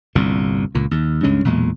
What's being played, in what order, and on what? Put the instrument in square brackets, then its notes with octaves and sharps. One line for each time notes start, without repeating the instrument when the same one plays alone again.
[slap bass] G1 C2 A#2
C#2 A#2
D#2
C#2 G2 G#3 C#4
B1 E2 A#2 G#3